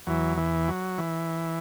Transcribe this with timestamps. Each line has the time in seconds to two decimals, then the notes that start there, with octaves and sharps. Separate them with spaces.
0.07 E2 E3 F#3
0.37 E3
0.68 F#3
0.98 E3